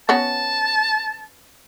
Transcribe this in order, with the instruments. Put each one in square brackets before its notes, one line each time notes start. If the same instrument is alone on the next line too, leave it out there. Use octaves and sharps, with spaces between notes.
[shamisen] B3 C#4 F#4 [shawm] A5